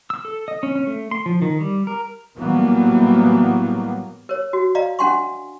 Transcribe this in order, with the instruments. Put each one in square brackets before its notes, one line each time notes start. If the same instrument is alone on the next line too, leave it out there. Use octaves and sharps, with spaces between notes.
[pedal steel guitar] E6
A4
D#5
C#4
C#4
A3
C6
F3
D#3
G3
A#4
[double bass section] A2 E3 F#3 G3 A#3 B3
[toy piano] A#4 C#5
F#4
D5 D#5 F5 A#5
C#4 D4 F#5 G#5 C6 C#6